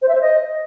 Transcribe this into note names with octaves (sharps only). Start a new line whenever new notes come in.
C5
E5
C5
D#5